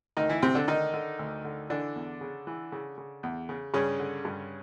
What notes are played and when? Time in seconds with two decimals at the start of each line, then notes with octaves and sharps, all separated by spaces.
0.17 D2 D#3 D#4
0.29 E3 E4
0.42 D2 C3 C4
0.55 D3 D4
0.68 D3 D#3 D#4
0.94 D3
1.19 D2
1.45 D3
1.70 D3 E3 D4
1.96 E2
2.21 C#3
2.47 E3
2.72 C#3
2.98 C#3
3.23 E2
3.49 C#3
3.74 G2 C#3 C#4
4.00 D3
4.25 G2